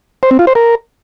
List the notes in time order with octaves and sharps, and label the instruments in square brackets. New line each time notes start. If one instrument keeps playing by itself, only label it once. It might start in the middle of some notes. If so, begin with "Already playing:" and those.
[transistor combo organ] C5
C4
F4
C5
A#4